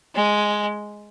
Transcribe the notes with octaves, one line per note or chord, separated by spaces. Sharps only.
G#3